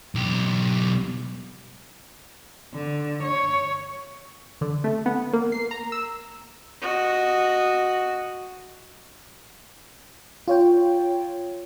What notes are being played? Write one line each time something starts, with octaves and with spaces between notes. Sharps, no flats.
B1 G4
D3
C#5
D3
A3
B3
A#3
C7
A#5
E6
F#4 D#5
F4 C#5 G5